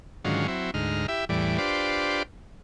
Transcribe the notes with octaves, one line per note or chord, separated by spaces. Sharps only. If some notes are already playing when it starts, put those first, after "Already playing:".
G#2 D3 D#3 F#3 C#4 F4
F#3 C4 E4
D2 G#2 D#4 F6
E4 G4 E5
E2 A2 E3 G3 D5
D4 F4 G4 B4 C5 D5